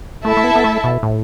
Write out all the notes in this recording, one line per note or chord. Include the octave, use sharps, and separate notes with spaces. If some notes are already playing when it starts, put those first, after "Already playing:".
A3 E4 A4 E5 A5
A3
B3
B3
A3
B2
A2